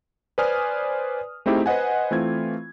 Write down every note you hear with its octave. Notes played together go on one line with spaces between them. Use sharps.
B4 C5 D5 G#5 D#6 F6
A3 C4 D#4 E4 G4 G#4
B4 C5 D#5 F#5 G#5
E3 A3 C4 F4 G#6